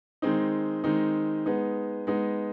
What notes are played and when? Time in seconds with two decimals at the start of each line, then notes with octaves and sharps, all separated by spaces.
0.22 D#3 G#3 C4 D#4
0.84 D#3 G#3 C4 D#4
1.46 G#3 B3 D#4
2.07 G#3 B3 D#4